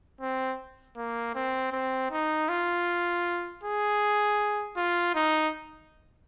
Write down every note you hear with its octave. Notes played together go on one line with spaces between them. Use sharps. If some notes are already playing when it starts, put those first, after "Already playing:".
C4
A#3
C4
C4
D#4
F4
G#4
F4
D#4